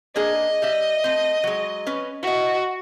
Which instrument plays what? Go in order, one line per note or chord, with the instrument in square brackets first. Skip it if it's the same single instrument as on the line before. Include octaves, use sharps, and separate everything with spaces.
[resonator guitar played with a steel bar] A#3 D4 G#4 [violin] D#5
[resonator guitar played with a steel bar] G3 D5 E5
A3 C4
F#3 G#3
C#4 B4
[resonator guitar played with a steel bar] E4 D#5 [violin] F#4